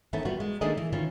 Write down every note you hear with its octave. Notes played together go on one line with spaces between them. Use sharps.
D#3 E3 A3 B3 C#4
G3 B3 F4 F#4
G#3
D#3 A3 A#3 D4 G#4 D#5
E3
D#3 E3 C#4 F4